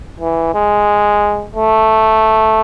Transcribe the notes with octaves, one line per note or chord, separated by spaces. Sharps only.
E3
G#3
A3